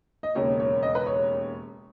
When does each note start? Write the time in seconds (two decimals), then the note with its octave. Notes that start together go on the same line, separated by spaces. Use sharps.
0.23 D#5
0.35 E1 D#2 C#3 C#5
0.60 C#5
0.83 D#5
0.95 B4
1.07 C#5